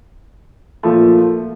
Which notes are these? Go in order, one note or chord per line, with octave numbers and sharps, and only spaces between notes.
A#2 F3 A3